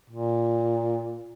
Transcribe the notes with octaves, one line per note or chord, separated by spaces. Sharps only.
A#2